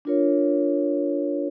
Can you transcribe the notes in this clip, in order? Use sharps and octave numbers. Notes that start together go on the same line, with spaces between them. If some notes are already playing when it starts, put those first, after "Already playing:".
D4 F4 A#4 C#5